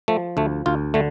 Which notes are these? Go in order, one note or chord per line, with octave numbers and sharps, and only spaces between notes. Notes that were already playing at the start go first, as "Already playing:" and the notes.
F3 A3
D2 A3
D2 F4
D3 A3